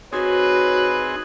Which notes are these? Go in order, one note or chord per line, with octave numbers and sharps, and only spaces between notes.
C4 D#4 F#4 G#4 B4 C#5